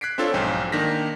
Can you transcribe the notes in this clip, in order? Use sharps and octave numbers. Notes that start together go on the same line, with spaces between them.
F#6 G#6 B6 C7 D7
C4 D4 F4 A4 C#5
B1 G#2 F3 G5 G#5
D#3 A#3 D4 D#4 A#6 B6